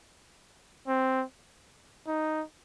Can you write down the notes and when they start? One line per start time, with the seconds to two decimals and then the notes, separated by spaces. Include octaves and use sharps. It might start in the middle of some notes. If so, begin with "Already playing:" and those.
0.88 C4
2.07 D#4